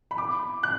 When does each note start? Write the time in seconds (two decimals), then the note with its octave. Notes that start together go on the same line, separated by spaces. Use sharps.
0.11 B5
0.18 D6
0.63 F#6